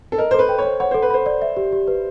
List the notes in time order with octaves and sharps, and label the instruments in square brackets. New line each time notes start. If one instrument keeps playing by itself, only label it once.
[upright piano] A4
[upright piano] A#4 [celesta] D#5
[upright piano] C5
[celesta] A4
[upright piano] B4
[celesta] G5
[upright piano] C#5
[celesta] C5
[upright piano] C#5 [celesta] F#5
[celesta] A4 [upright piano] C5
[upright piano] B4
[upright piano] C5 [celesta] B5
[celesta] D5
E5
G4
G4
B4